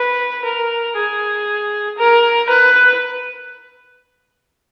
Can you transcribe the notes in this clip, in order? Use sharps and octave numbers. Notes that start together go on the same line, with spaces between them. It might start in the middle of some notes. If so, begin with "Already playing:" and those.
Already playing: B4
A#4
G#4
A#4
B4